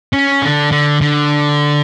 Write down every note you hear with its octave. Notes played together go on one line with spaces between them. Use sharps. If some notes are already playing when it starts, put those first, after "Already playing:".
C#4
D3
D3
D3